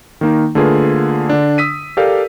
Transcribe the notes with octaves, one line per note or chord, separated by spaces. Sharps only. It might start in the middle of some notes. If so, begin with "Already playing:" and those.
D#3 A#3 D#4
D3 A3 A#3 F4 G#4 B4
D3 D4
D#6 E6 B6 D#7
G4 A4 A#4 D5 F5